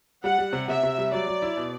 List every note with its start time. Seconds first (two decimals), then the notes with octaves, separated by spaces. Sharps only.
0.24 G3 F#5
0.38 G3
0.53 C3
0.68 C3 E5
0.83 C3
0.98 G3
1.12 F#3 D5
1.27 F#3
1.42 E4
1.57 B2